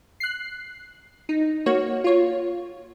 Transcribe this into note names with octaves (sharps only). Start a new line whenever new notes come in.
F#6 C7
D#4
A#3 F#4 C#5
F4 C#5